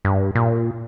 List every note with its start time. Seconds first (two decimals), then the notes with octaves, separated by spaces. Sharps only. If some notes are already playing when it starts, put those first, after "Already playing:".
0.05 G2
0.35 A#2